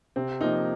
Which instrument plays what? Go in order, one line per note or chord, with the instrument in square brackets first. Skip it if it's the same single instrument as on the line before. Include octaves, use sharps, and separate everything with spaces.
[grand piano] C3 [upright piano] C4
[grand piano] F3 A#3 [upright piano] D#4